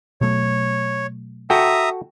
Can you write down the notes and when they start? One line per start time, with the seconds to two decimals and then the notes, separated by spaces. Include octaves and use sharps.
0.21 B2 F#3 A3 C#5
1.50 F#4 A4 E5 G5 A#5 D#6